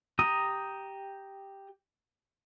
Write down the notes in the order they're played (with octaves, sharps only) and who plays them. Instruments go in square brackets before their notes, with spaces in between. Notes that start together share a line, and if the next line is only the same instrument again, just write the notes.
[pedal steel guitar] G4 A#5 D#6